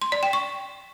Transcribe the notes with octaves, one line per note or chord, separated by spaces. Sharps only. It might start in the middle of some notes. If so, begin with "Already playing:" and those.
C6
D5
G5
C#6